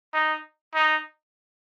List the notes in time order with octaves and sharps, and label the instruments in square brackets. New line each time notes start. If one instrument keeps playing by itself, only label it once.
[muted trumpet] D#4
D#4